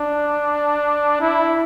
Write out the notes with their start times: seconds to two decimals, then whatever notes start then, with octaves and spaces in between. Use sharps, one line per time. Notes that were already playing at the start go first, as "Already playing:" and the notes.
Already playing: D4
1.21 E4